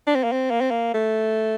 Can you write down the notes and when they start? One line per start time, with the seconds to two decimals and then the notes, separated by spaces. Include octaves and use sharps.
0.07 D4
0.15 C4
0.24 A#3
0.32 C4
0.51 A#3
0.61 C4
0.71 A#3
0.94 A3